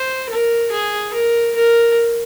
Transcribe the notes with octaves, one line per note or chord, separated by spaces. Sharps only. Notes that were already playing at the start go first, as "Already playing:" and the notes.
Already playing: C5
A#4
G#4
A#4
A#4